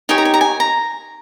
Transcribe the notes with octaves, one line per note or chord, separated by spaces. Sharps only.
D#4 G4 C#5 G#5
A#5
G#5
A#5
G#5
A#5